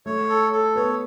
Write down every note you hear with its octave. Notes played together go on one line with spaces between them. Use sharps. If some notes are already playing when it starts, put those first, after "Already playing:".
A3 C#5
A4
A4
B3 C#5